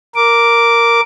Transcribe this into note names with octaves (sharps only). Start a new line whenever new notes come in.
A#4 D6